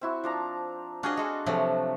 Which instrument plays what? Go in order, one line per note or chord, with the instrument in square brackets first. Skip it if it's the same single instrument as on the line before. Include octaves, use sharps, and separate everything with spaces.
[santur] C4 E4 F#4
F3 D4 A#5
[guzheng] D4 G#4 D#5 [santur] F#4 F5 G#5
[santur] G#3 [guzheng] F#4 A4
[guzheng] C3 F3 F#3 [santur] A3 A4 E5